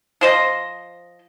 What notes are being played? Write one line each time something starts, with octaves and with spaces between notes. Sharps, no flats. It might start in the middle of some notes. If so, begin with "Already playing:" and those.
F3 C5 D#5